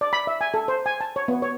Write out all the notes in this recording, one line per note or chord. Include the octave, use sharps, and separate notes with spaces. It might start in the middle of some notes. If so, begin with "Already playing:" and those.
D5
B5
E5
G#5
A4
C5
G#5
A5
C#5
B3
C#5